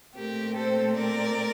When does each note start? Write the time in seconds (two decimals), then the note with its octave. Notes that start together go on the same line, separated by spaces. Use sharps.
0.16 A#2 A3 C4 G4 A#4
0.57 A4 C5
0.97 A#4 D5